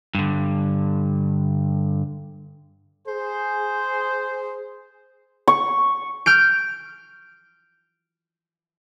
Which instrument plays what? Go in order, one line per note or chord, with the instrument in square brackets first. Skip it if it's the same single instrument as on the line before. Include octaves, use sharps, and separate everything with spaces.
[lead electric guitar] G2 D3
[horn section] G#4 C5
[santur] C#6
[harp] F6 G6 D7